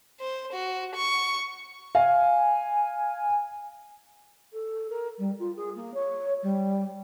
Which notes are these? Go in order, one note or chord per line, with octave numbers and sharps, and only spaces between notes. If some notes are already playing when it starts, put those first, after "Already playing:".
C5
F#4
C#6
F5 G#5
A4
A#4
G3
F4
G#4
A#3
C#5
G3